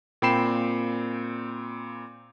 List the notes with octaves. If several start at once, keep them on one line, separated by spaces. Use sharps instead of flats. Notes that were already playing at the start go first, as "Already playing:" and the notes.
A#2 C4 G5 B5 C7 E7